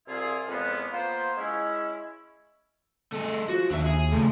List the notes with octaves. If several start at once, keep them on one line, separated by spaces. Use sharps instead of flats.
C2 E4 F4 G#4
F2 C#3 E3 F3 G#3 B3
A#3 B3 F4 B4 C5
G#3 C#4 E4
A3 G#4
F3 F#4
D#2 D3 E5
G#4
C#3 F3 A3